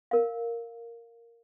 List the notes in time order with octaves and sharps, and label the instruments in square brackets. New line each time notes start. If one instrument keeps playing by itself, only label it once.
[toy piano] A#4 F5